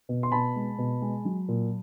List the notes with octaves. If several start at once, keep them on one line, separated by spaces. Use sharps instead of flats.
B2
C6
B2 A5 B5
G#3
B2
G#3
F#3
A#2